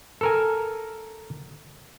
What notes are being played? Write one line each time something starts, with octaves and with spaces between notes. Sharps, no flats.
A4 A#4 G#5